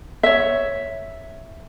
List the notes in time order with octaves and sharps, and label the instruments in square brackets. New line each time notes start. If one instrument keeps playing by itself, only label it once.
[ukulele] C#5 E5